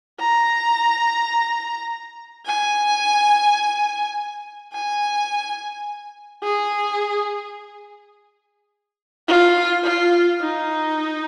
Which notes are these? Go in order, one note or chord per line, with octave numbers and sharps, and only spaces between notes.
A#5
G#5
G#5
G#4
F4
F4
D#4